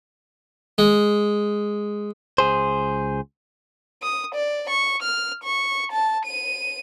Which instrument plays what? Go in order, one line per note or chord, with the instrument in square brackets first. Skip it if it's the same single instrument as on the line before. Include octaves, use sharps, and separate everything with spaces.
[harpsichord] G#3
[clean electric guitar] C#2 G#4 C5
[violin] D#6
D5
C#6
F6
C#6
A5
D#7